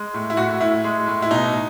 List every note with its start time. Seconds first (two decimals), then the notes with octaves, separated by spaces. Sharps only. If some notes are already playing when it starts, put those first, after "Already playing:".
Already playing: G#3
0.14 A2
0.30 E4
0.37 A2 F#4
0.60 A2 E4
0.84 G#3
1.07 A2
1.22 E4
1.31 B2 D#4